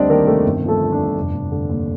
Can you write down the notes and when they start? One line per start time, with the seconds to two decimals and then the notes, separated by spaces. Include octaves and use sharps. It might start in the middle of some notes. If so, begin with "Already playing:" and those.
Already playing: D2 G3 C4 D4 C5 D5 D#5
0.09 D#3 A#3 A#4
0.27 C3 A3 A4
0.45 G1
0.63 F3
0.68 A3 A4
0.81 D3
0.92 D4
0.99 G2
1.17 F1
1.34 F1
1.51 D3
1.69 D#2